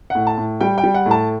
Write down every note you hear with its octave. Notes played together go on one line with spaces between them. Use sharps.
F#5
A2
A5
A2
G3 G5
G5
G3
F#5
A2
A5